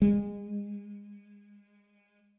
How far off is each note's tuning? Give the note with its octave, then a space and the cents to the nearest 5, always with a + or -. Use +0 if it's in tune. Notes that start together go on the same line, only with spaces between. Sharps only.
G#3 -25